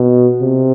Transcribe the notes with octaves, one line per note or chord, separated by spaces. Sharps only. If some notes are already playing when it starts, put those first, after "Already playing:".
Already playing: B2
C3